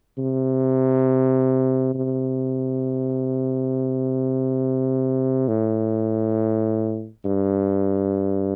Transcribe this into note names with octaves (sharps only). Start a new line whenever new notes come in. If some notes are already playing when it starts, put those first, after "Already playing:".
C3
C3
A2
G2